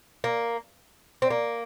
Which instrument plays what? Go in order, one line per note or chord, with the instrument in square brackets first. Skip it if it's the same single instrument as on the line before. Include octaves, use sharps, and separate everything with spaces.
[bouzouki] A#3
C4
A#3